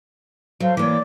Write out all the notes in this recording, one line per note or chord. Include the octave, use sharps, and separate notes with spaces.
F#3 A4 C5 F5
E3 A#3 C#5 D5 D6